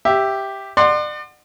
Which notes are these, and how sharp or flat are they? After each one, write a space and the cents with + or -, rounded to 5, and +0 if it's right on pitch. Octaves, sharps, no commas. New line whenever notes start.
G4 +0 E5 +0
D5 +40 F#5 +0 C6 +0